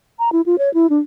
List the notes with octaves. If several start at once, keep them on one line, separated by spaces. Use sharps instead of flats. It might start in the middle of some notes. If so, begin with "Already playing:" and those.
A#5
E4
F4
C#5
E4
D4